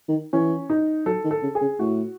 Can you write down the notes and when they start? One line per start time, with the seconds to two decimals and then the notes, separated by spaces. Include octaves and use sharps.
0.08 D#3
0.33 E3 C#4
0.70 D#4
1.06 F#3 A4
1.24 D#3
1.31 A4
1.43 C#3
1.55 G#4
1.61 C#3
1.79 A2 F#4